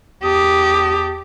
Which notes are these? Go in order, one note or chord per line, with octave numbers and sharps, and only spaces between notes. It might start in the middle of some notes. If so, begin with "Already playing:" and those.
E2 G4 A5 D#6